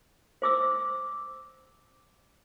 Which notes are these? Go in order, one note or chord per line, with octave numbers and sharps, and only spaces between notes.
C5 D6 E6